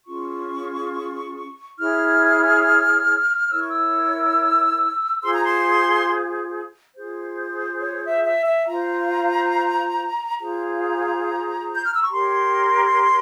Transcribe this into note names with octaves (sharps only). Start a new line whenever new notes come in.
C#4 F4 G#4 C#6
E4 G#4 C#5 F6
E4 A#4 C#5 E6
C#6
E6
F4 G#4 C5 C6
A#5
C6
F4 G#4 C5
C#5
E5
E5
E5
F4 C5 A#5
F4 G#4 C5 A#5
G6
F6
E6
C#6
G4 A#4 C#5 C6